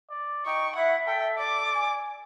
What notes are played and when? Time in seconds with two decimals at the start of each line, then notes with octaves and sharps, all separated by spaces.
0.10 D5
0.46 D#4 G5 C#6
0.76 E4 E5 F#5
1.08 A4 G5
1.38 D5 D6
1.74 G#5